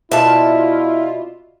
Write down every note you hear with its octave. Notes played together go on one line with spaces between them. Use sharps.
B2 E4 F4 D5 E5 A5